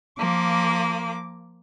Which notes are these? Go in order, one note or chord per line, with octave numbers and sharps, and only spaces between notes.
F3 A#3 D6